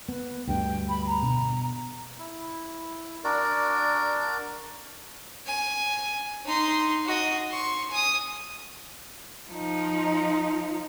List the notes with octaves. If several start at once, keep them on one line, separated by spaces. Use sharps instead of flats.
B3 B4
D2 G2 G5
B5
A#5
B2
E4
D4 F#4 A#4 D5
G#5
D#4 C6
F#4 D#5
C6 C#6
G#5 D#6
F3 D#4